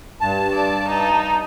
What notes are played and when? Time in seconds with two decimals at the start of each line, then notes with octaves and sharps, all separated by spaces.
0.20 G2 A5
0.53 D5
0.88 D#4